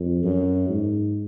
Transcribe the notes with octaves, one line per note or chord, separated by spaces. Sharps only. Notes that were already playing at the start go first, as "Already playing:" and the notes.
Already playing: F2
F#2
G#2